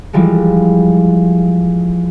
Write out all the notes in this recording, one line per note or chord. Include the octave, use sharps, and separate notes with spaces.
E3 F3 G3 G#3